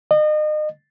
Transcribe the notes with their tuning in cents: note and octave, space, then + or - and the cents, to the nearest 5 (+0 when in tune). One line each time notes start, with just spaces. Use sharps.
D#5 -35